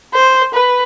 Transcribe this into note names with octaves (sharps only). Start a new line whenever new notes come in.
C5
B4